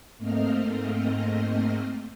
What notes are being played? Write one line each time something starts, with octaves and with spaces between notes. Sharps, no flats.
G#2 A3 A#3 C4 D#5 F6